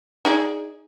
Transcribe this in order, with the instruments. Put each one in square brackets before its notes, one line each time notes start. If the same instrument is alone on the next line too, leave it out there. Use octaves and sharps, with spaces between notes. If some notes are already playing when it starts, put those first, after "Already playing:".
[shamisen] D#4 G#4 D5